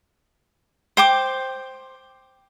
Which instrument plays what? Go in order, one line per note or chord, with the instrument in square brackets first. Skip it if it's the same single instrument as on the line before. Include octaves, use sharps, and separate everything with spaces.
[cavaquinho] C5 G5 D6